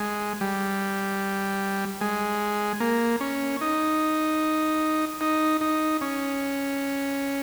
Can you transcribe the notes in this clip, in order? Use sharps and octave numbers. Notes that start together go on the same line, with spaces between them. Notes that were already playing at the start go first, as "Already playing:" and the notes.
Already playing: G#3
G3
G#3
A#3
C#4
D#4
D#4
D#4
C#4